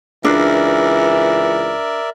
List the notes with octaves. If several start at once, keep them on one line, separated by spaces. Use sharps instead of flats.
C#2 E3 D4 A#4 D5 E5